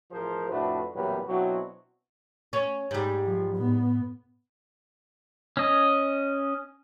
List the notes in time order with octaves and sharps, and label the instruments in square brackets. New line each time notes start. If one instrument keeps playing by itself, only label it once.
[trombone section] A1 F3 G#4 A#4 C5
F2 A2 A3 D4 F#4 B4
A1 E2 A#2 F#3 G3 B4
B2 F#3 C4 D4 E4 F#4
[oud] C#4
G#2 G3
[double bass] F3
A2 B3
[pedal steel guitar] C#4 D#5